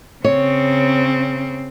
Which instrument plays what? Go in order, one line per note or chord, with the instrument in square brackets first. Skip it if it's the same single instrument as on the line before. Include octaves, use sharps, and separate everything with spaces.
[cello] C#3 C4 [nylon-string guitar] C#5